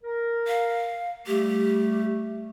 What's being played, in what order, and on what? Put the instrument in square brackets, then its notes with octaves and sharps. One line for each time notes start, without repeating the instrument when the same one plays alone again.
[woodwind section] A#4
[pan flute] F5
[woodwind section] G3 A3 [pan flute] G4